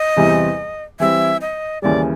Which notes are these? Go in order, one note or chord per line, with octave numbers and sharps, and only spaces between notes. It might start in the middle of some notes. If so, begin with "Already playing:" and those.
Already playing: D#5
E2 C3 E3 G3 C4
E3 G3 C4 E5
D#5
D#2 C#3 E3 G3 D5